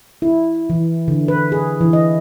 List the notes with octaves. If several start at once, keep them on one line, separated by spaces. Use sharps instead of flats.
E4
E3
D3
B4
G#4
E3
D#5